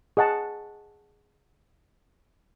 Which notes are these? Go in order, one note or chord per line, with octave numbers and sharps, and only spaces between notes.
G#4 D#5 F#5 A5